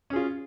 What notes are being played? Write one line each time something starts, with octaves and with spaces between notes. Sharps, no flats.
C#4 F4 G#4